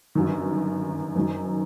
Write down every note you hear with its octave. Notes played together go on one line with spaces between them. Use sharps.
G1 F#2 D#3
F#1 F#2 D#3